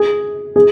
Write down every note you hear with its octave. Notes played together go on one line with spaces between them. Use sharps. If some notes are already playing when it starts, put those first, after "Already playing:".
Already playing: G#4
G#4